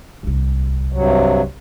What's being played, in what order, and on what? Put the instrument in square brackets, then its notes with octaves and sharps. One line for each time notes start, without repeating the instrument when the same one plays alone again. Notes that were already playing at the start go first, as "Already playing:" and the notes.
[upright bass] D1 C2
[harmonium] G2 C3 F#3